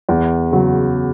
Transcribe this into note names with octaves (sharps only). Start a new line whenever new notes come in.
E2
C#3 F#3